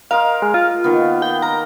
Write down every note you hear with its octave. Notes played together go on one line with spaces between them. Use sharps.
A#4 D#5 F5 C6
G#3
F4
D#3 A#3 B3
G5
A#4 A#5